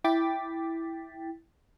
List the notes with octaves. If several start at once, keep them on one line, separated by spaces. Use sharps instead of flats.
E4 G5 D6 A6 B6